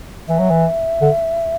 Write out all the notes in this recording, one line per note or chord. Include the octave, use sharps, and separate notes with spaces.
E3 E5
F#3
E3
D3